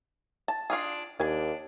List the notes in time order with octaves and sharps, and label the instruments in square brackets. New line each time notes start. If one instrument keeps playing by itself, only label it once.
[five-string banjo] A5
D4 F4 G#4
[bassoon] D#2 [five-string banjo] D4 G#5